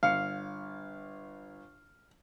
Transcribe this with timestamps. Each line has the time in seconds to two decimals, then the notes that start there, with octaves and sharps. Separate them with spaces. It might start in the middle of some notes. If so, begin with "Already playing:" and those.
0.03 G1 F5 C#7